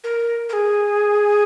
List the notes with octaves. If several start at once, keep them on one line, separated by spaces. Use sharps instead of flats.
A#4
A#4
G#4